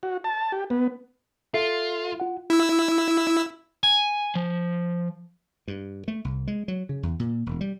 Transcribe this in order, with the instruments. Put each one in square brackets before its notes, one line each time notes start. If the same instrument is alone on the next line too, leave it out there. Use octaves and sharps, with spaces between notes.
[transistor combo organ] F#4
A5
G4
B3
[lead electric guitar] F4 [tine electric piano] A4 E5 C7
[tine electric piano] F4 F#5
[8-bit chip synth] E4 E6
[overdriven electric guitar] G#5
F3
[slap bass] G2
A3
C2
G#3
F#3
C#3
E2
A#2
E1
G3